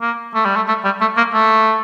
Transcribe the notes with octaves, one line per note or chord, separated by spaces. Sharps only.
A#3
A3
G3
A3
A3
G3
A3
A#3
A3